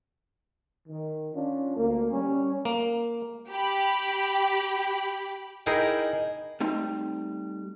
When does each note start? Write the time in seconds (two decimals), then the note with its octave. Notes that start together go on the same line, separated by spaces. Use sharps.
0.89 D#3
1.34 C#4 D4 F4
1.76 D2 A#3
2.11 G3 C#4
2.65 A#3
3.50 G4 B5
5.66 D#4 E4 G#4 A#4 D#5 G5
6.60 G3 A3 C4 D#4